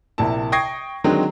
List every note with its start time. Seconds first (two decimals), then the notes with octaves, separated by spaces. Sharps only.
0.18 A#1 C3 A#3 E4 A5
0.52 G5 C#6 D#6 G#6 A#6 C7
1.04 D3 D#3 F#3 G#3 C4 D#4